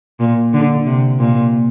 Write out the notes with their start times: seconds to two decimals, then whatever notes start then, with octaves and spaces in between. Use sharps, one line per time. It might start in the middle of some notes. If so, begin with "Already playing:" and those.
0.20 A#2
0.54 D3
0.86 C3
1.19 A#2